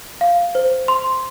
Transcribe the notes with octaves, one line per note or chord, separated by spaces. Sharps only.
F5
C5
C6